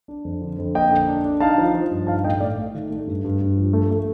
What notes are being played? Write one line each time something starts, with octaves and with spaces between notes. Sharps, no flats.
D4
F2
D3
F2
A#3 D#5 G5
D3
D4
D4
D#4 F5 A5
F3
F3
G2
D#4 F5 A5
A2 D#5 G5
A2 D5 F5
A3
D#3
A3
G2
G2
G2
F3
A3
A3